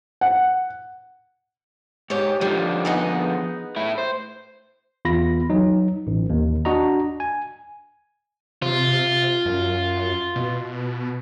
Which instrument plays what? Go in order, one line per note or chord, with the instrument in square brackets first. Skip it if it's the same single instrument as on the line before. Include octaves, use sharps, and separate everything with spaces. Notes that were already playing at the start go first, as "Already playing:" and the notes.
[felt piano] F#5
[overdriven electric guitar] G#2 [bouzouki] G4 C#5
[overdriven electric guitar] D3 F3 [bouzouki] D#3 G3
[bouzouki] B3 D#4 G#4
[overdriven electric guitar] A2 E4
C5
[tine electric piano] E2 F4 B5 A#6
F#3 D#4
A1
D#2
D4 F#4 D#5 A#5
G#5
[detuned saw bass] C3 [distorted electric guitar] F4
[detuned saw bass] C3
F#2
B2